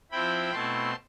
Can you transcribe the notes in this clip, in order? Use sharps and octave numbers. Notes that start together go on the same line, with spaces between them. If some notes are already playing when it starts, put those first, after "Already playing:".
F3 C4 E4 G5 B5
B2 A3 C4 E4 A5 C6